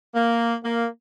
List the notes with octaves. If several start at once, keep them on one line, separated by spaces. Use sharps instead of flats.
A#3
A#3